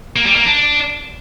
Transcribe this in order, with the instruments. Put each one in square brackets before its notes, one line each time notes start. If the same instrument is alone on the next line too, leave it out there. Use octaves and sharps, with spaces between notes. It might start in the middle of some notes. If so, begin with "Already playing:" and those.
[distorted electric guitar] A#3
G3
A#3
D4